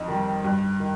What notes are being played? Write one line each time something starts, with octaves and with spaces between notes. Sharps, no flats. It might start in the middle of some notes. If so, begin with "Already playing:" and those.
Already playing: F2 D#4
D#3 G3
G2
D#3